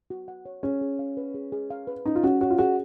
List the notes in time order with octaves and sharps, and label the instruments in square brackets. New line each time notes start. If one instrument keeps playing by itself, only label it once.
[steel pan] F#4
F#5
C#5
[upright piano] C#4 [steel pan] G#4
[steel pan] G#4
F5
B4
G#4
G#4
F5
B4
[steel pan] C#4 [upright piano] D#4
[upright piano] F4
[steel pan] C#4 [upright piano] F#4
[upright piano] F#4 [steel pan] C#5
[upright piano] F4
[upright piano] F#4 [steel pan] G#4